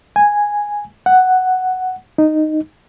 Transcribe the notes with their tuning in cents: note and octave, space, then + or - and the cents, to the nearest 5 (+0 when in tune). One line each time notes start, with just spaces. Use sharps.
G#5 -5
F#5 +5
D#4 -10